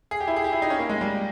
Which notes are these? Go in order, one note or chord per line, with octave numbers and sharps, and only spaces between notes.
G#4
G4
E4
G#4
G4
E4
D#4
C#4
A#3
G#3
G3